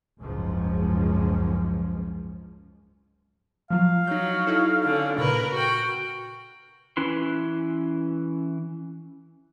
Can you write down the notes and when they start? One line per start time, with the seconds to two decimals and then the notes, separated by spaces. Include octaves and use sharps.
0.20 F#1 C#2 G#2 F3 G#3 C#4
3.70 F3 F#3 F4 F5
4.07 F#3 D#4 G6
4.47 D#4 E4 A4
4.84 D3 C#4
5.19 A#2 C#3 A#4 B4
5.53 F#4 G5
6.97 E3 C#4 E4 B4 C6